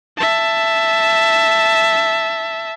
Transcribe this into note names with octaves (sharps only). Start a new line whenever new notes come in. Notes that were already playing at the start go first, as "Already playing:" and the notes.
E5 A5